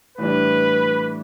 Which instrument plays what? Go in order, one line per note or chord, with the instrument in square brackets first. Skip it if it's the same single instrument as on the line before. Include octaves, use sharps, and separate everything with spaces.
[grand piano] A2 E3 G3 D4 [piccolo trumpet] B4